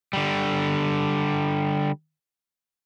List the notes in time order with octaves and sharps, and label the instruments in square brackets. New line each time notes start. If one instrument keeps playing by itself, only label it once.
[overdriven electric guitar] D3 G3